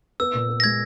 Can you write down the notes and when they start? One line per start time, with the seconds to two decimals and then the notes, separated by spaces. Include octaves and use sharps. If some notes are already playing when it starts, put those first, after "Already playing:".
0.20 B3 E6
0.34 A#2
0.49 B3
0.60 A#6
0.64 G#3 G#6